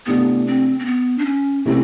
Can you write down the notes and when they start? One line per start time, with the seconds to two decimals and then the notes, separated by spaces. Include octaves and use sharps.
0.07 C3 E3 A3 B3 D4 G4
0.47 C4
0.79 C4
0.86 B3
1.18 D4
1.26 C#4
1.65 C3 E3 A3 C4 C#4 E4